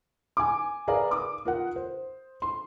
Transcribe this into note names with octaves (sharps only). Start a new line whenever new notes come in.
G#5 D6
G#4 A#4 B4 D5 F5 A#5
D6 D#6
F4 A#4 F#5
C5
C6